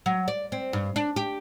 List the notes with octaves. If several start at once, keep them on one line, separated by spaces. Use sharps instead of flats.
F#3
D5
C4
G2
D4
G4